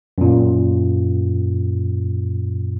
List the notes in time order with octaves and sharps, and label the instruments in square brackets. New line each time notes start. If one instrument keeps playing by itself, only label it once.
[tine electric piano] F#2 A#2